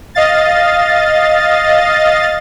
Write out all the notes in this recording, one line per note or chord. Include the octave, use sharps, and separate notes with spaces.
D#5 F5 A6